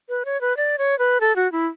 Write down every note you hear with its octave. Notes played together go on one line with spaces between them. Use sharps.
B4
C#5
B4
D5
C#5
B4
A4
F#4
E4